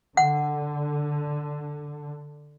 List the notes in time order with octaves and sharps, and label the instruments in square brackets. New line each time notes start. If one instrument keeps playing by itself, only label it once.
[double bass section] D3 [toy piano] F#5